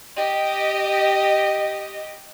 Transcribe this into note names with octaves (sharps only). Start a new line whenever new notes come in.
G4 D#5